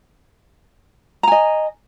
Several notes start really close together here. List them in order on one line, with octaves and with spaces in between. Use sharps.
A#5 G#5 D#5